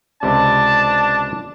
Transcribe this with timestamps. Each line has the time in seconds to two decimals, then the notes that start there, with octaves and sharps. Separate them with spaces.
0.23 C#2 C3 D4 A5